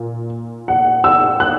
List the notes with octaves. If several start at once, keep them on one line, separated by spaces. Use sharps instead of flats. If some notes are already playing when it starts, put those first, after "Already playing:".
Already playing: A#2
F#5
E6
F#6